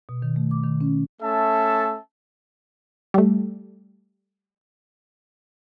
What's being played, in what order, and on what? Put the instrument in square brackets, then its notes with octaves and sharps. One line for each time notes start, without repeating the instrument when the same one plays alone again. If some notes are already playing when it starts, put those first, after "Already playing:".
[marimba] B2
D#3
A3
D6
D#3
C#4
[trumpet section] A3 C#4 A4 E5 A5
[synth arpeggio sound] G3 A3